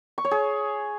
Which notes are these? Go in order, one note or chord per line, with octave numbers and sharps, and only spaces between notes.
C#6
C#5
G#4